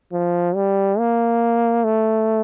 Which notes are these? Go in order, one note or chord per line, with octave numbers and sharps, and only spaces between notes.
F3
G3
A#3
A3